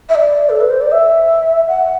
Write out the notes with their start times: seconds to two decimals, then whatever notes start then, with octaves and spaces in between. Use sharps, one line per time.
0.09 E5
0.15 D5
0.49 A4
0.60 B4
0.70 C5
0.81 D5
0.92 E5
1.68 F#5